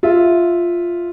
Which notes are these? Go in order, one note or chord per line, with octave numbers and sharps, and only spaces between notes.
F4 E5